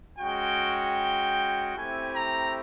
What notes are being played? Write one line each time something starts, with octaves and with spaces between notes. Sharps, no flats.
G#3 C#4 F#4 G5
A3 C4 E4 G4 G#5
A#5